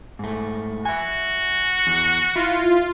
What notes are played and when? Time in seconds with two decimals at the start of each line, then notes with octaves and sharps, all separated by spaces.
0.19 G#2 A3
0.85 F#4 E5 G#5
1.87 E2
2.36 E4 F4